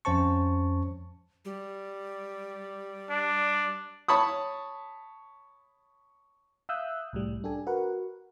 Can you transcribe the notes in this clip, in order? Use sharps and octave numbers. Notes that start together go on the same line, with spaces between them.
F2 C#4 C5 A5 C#6
G3
D4
C#5 A5 B5 C#6 D#6
E5 F5 D#6 E6 F#6 G6
C2 A2 G3
D4 G4 A4 G#5
F#4 A#4 B4 F#5